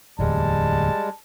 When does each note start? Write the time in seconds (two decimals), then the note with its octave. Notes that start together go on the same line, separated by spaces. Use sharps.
0.19 D1 E2 G3 G#3 A5